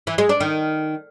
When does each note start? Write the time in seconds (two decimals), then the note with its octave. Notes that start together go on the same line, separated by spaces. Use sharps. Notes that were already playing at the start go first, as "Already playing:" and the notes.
0.07 E3
0.18 G#3
0.29 D4
0.40 D#3